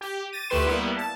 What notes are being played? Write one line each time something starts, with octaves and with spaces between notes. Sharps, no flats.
G4
A6 A#6 D#7
D2 A3 G4 B4 C6 E7
G3 A#3 B3 E4
A5